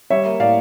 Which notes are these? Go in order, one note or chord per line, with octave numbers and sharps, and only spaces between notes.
G3 C#5 E5
A#3
A2 D5 F5